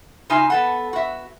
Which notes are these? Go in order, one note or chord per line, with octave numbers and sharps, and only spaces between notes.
C#3 D#4 F4 E5 G#5 A#5
B3 A4 F#5
F#4 E5